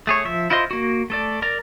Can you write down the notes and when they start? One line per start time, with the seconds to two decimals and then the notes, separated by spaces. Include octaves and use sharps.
0.07 A3 G#4 C#5
0.25 F3 E5
0.50 E4 F4 C5 D#5 C6
0.71 A#3 F#4
1.10 A3 A4 D5
1.42 A#4 D5 A#5